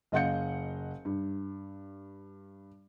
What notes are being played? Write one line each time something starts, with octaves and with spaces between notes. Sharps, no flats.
F#1 D#5 F5 F#5 G6 C#7
G2